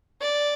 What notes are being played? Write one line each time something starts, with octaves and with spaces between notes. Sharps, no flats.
D5